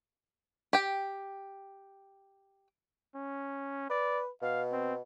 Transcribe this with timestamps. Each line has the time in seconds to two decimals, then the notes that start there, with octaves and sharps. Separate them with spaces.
0.73 G4 G5
3.15 C#4
3.90 B4 D5
4.42 B2 F5
4.72 C4